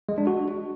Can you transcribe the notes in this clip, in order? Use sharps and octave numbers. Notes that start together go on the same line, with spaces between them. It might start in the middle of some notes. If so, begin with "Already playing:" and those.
G#3
D4
F#4